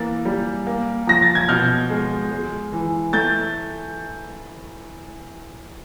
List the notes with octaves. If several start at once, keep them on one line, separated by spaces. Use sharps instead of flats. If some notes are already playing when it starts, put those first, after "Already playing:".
Already playing: E3 A#3 A6
G3
A#3
F3 A#6
A6
G#6
B2 F6 G6
G#3
G#3
E3
A3 G6 A6